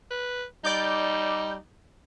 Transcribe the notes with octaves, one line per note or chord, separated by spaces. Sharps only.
B4
G3 D#4 D5 D6 G6